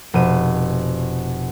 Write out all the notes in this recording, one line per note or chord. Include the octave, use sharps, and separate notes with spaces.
F1 B2 D#7 E7